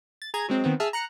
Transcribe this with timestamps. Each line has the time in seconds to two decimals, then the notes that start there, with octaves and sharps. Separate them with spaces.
0.22 A6
0.34 G#4 A#5 G#6
0.48 F#3 G#3 C4
0.64 D#3 B3 C4
0.80 G#4 E5 A5 F6
0.93 A#5 F#6 C#7